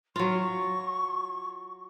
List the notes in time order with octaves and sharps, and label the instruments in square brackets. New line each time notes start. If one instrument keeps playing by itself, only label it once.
[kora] F#3 F4 [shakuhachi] C#6